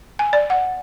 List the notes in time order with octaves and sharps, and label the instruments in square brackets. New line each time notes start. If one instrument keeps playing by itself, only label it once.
[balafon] G#5
D5
F#5